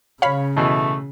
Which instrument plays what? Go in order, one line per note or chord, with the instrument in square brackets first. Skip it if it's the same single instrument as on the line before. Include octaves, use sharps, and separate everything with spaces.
[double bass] C#3 [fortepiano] C#5 [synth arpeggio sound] F5 B5
[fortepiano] B2 E3 [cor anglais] A3